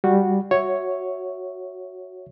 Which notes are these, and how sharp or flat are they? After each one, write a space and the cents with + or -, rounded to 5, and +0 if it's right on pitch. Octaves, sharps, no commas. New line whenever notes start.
G3 +0 F#4 -10
F#4 +0 C#5 +0 E5 +0